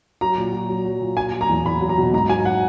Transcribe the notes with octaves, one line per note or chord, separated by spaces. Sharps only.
F#3 A#5
A#2
F#3
F#3
F#3
A#2
F#3 G#5
F#3
A#5
E2
E2 B5
F#3
A#5
B2
G#2 A#5
F#3 G#5
F#5